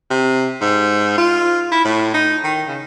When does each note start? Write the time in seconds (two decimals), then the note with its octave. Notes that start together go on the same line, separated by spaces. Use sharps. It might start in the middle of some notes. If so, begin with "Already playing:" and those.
0.10 C3
0.61 G#2
1.18 F4
1.71 E4
1.85 A2
2.14 D#4
2.44 D#3
2.67 C#3